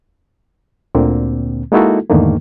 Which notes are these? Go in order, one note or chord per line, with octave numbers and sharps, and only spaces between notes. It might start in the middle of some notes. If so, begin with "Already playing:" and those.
D2 A#2 D3 A#3 C4
G#3 A#3 D#4 E4 F#4 A4
E2 G#2 D3 D#3 A3 A#3